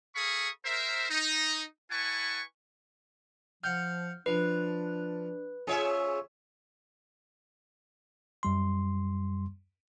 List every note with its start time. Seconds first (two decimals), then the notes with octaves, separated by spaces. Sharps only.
0.16 G#4 A4 F5 B5 C#6 D#6
0.65 A#4 C5 E5
1.10 D#4
1.91 E4 B4 F#5 G#5 A5 C#6
3.64 F3 F5 F#5 F6 G6
4.26 F3 D4 B4
5.67 C#4 F4 G#4 C5 C#5 E5
8.43 F#2 G3 C6